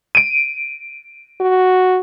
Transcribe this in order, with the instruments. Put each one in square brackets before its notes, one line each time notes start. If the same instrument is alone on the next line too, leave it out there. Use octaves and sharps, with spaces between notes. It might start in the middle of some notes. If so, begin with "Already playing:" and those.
[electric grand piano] D7 D#7
[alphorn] F#4